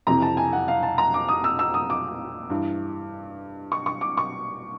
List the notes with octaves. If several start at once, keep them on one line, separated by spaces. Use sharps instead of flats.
F2 C3 E3 A#5
A5
G#5
F#5
F5
A5
A#5
D6
D#6
E6
E6
D#6
D6
G2 E3
C#6
C#6
D6
C#6